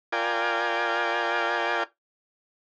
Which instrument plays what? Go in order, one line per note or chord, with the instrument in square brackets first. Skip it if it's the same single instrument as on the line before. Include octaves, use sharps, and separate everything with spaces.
[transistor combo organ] F4 A#4 D5 G5 G#5